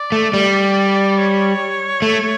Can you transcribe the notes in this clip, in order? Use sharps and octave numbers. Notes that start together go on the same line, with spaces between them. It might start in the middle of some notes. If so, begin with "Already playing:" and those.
Already playing: D5
A3
G3
C#5
A3